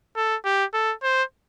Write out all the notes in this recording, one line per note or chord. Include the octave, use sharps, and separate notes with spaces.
A4
G4
A4
C5